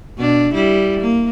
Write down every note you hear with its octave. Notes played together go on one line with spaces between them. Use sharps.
B2 D4
G3 E4
A#3